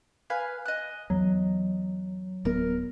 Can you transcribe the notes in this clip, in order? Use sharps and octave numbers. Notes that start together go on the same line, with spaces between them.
B4 F5 G#5
D#5 F#6
E2 F#3
D1 B3 A#4